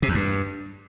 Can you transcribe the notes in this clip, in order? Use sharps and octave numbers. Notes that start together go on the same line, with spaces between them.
C3
E2
G2